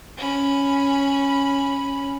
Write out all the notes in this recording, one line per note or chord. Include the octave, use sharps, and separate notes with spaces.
C#4 B5